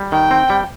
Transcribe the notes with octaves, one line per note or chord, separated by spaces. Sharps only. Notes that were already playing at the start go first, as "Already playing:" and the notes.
Already playing: G3
D#3 G5
C4
G3